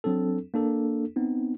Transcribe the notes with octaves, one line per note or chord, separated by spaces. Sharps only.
F#3 C4 D4 A4
A#3 D4 A4
B3 C4 D#4